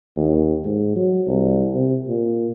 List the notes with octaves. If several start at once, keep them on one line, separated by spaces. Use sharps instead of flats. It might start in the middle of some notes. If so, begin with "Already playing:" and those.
D#2
G#2
F#3
C2
C3
A#2